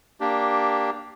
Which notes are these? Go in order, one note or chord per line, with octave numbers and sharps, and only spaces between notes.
A#3 D4 G4